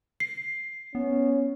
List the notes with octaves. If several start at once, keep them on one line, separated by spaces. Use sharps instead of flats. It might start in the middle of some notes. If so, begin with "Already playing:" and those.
C7
B3 C#4